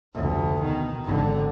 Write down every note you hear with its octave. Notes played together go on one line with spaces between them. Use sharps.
F1 D2
B2 D#3
G#1 D3